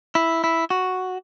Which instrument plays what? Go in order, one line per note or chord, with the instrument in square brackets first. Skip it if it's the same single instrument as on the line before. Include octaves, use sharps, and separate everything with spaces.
[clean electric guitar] E4
E4
F#4